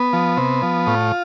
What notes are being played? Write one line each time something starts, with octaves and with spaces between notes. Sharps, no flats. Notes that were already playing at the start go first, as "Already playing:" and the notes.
Already playing: B3
F3
C3
F3
A2 F4